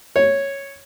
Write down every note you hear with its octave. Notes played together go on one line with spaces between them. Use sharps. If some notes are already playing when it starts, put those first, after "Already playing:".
C#5